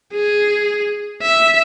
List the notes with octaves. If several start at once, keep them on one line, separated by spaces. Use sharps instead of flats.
G#4
E5